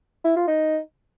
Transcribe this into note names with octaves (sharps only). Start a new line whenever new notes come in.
E4
F4
D#4